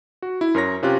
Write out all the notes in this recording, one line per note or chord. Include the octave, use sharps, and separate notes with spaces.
F#4
E4
F#2 A#4 C#5 A#6
C3 C#4 F4 G4 F#6